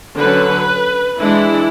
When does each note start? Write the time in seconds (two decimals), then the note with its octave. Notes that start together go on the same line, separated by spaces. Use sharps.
0.18 D3 F#3 C#4 B4
1.20 E3 G#3 D4 E4